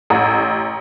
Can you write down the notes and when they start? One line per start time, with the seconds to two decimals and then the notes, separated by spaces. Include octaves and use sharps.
0.10 A1 A#5 D#6